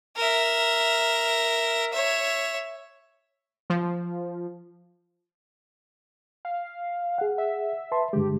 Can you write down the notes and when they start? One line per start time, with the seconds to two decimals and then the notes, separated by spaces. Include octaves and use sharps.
0.17 A#4 E5
1.92 C#5 E5
3.70 F3
6.45 F5
7.18 G#4 F#5
7.38 E5
7.92 B4 A5 C6
8.13 G2 D3 G#3 G4